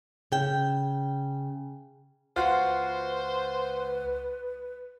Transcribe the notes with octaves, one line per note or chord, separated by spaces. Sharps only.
C#3 G5
C#2 F4 F#4 B4 C5